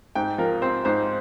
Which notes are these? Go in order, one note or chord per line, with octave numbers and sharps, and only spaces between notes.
G#2 G5
F3 A#4
C4 C5
G#2 C5